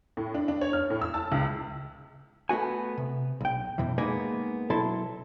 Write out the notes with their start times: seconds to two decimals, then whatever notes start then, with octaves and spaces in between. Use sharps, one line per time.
0.17 A2
0.34 D4
0.48 D4
0.61 C#5
0.73 F6
0.90 A2
1.01 E6
1.14 A5
1.32 C#2
2.49 A3 B3 F#4 G#5
2.98 C3
3.41 B1 G5
3.78 F#2 B2 E3
3.98 G#3 A#3 B3 D#4 G#5
4.70 B2 F#3 E4 A4 A5 C6